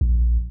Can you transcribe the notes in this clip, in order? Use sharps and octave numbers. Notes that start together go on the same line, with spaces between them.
A#1